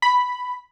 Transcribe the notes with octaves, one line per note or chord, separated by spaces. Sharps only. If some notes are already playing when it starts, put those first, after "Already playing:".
B5